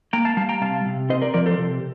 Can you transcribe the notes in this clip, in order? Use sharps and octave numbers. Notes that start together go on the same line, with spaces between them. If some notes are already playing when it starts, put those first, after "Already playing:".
A#3 G5 A#5
F5 A5
G3 F5 A5
G5 A#5
C3 F5 A5
C3
C4 C5 D#5
A#4 D5
F3 A#4 D5
A4 C5
C3